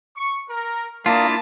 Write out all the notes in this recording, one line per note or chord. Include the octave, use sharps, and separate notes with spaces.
C#6
A#4
A#3 D4 E4 F4 D5 A5 D#6